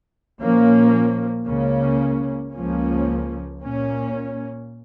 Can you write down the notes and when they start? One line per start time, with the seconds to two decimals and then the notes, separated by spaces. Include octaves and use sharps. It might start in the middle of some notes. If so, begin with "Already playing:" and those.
0.41 A#2 F3 A#3 C#4
1.46 C#2 C#3 A#3 C#4
2.52 C#2 C#3 F3 A#3 C#4
3.59 A#2 A#3 C#4